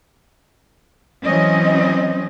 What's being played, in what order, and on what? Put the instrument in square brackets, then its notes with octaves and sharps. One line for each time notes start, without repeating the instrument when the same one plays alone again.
[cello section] E3 F#3 C4 C#4 D#5